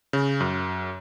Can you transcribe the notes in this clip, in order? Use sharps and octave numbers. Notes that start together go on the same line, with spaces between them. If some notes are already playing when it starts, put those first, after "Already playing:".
C#3
F#2